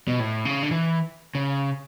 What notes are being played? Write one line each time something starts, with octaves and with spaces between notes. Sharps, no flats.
B2
A2
C#3
D3
E3
C#3